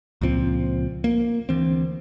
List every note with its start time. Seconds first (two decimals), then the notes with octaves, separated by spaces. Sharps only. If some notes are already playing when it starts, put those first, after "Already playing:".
0.21 C#2 A#2 F3 C4
1.04 A#3
1.49 D2 E3 C4